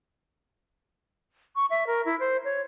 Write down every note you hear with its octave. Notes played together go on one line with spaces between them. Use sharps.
C#6
E5
A#4
E4
C5
C#5